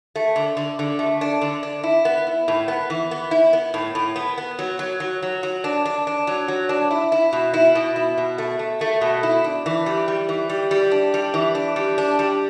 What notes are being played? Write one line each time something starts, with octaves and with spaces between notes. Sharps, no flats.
A3
D3
D3
D3
A3
D4
D3
D4
E4
B3
E4
A2
B3
E3
B3
E4
B3
A2
A2
B3
B3
F#3
F#3
F#3
F#3
F#3
D4
D4
D4
F#3
F#3
D4
E4
E4
B2
E4
B2
E4
B2
A3
A3
A3
B2
E4
D4
E3
G3
G3
E3
G3
G3
D4
G3
E3
D4
G3
D4
G3